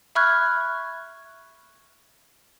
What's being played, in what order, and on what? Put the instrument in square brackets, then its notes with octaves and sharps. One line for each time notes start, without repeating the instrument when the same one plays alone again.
[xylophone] E5 B5 C#6 F6 F#6 G#6